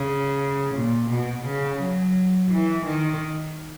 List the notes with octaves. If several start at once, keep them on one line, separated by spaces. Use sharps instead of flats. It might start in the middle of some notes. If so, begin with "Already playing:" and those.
Already playing: C#3
A#2
B2
C#3
F#3
E3
D#3